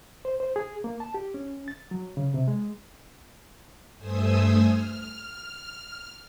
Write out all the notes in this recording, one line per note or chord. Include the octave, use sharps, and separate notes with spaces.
C5
C5
G#4
A#3
A5
G4
C#4
A6
F#3
C#3
C3
G#3
G2 A3 C5 G#5 D#6 E6
F6